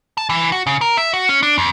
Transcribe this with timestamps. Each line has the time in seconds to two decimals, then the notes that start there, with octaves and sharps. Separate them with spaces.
0.18 A5
0.29 E3
0.52 F#4
0.67 C#3
0.81 A#4
0.97 E5
1.14 F#4
1.29 C#4
1.43 D4
1.58 F2